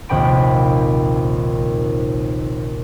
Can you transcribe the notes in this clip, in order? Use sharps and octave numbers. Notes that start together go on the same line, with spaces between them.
A#1 D#2 C3 G5 B5 D7